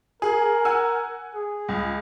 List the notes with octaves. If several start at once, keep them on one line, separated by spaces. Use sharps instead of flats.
G#4 A#4
F#5 G#5 E6
G#4
C#2